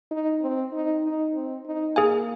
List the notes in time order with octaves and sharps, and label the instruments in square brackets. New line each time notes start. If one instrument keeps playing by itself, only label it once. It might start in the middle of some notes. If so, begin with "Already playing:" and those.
[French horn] D#4
C4
D#4
D#4
C4
D#4
[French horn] A#3 [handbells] G#4 F5 G#5